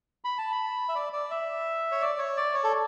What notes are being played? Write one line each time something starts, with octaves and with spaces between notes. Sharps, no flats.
B5
A5
B5
E5
D5
D5
E5
C#5
D5
C#5
D5
C#5
A4